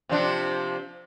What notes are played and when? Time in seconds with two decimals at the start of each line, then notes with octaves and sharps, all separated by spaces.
0.09 C3 F3 D4